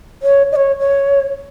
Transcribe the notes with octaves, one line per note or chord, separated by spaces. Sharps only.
C#5
D#5
C#5
C#5